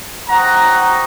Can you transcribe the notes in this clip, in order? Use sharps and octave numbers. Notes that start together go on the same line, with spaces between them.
C4 D#4 F#4 F#5 A#5